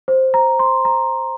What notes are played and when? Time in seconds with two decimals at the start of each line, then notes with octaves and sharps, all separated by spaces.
0.08 C5
0.34 A#5
0.59 C6
0.85 A#5